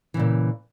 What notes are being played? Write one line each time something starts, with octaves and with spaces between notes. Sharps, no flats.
A#2 C#3 E3